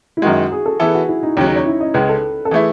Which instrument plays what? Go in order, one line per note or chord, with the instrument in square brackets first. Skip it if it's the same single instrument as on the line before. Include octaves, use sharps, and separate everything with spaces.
[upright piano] E4
[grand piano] F#2 D#3 G#3 [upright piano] F#4
[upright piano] G#4
A4
[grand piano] E3 B3 E4 A4 [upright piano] G#4
[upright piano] F#4
E4
D#4
[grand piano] D#2 C#3 F#3 [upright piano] C#4
[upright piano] D#4
C#5
E4
D#5
[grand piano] C#2 C#3 G#3 [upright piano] B4
[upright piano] A4
A4
[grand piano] E3 A3 E4 [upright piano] G#4